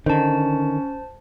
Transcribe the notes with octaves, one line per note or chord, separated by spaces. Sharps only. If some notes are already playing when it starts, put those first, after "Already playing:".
D3 D#3 C#4 C5 A5